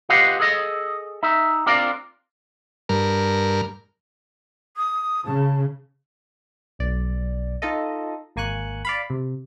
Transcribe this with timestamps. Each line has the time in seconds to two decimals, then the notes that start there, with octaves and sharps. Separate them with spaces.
0.09 F4 G4 B4 D#5 F5 F#5
0.40 G#4 A4 D#5
1.23 D#4 E5
1.66 C4 D4 F4 A#4 D5
2.89 G2 A#4
4.77 D#6
5.26 C#3 A5
6.79 B1 D5
7.62 D#4 F4 A4 D#5
8.36 G#1 A#3 G#5 C#6 F#6
8.85 D5 F5 B5
9.10 C3